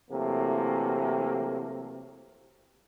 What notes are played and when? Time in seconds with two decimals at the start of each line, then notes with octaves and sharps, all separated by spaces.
0.11 C3 E3 F#3 A3 A#3